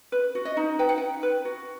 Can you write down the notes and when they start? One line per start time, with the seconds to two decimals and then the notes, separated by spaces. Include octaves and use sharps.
0.12 B4
0.35 F#4
0.45 D#5
0.57 D#4
0.79 B4 G5
0.89 F#5
0.98 D#4 G5
1.23 B4
1.45 F#4